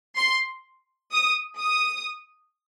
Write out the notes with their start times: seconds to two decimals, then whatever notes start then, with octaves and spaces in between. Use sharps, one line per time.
0.16 C6
1.11 D#6
1.58 D#6